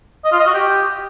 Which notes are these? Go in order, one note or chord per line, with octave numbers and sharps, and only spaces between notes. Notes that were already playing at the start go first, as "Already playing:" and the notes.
D#5
F4
D#5
F#4
G4